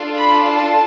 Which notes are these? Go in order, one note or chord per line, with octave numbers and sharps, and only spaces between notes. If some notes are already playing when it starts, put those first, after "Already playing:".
Already playing: D4 F4 A4
B5
A5